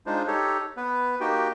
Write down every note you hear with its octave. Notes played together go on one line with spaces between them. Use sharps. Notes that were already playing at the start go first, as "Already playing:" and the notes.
G#3 D4 D#4 F4 C5
D#4 G4 A4 C#5
B3 B4
A#3 D#4 F#4 G4 G5